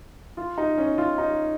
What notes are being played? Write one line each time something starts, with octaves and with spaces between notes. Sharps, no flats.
F4
D#4
C#4
F4
D#4